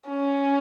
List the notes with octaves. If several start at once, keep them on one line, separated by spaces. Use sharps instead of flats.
C#4